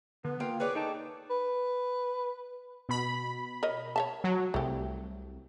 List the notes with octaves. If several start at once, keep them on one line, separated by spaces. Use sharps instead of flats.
D3 B3
A#3 F4 A#4 F5 G5
G#4 B4 C#5 D5
D#4 A4 G5 A5
B4
B2 B5
A#4 C#5 D#5
C#5 E5 A5
F#3
C2 A3 G4